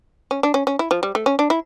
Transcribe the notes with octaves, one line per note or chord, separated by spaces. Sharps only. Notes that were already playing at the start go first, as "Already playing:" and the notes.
C#4
D4
C#4
C#4
E4
F3
G3
A3
C#4
D4
E4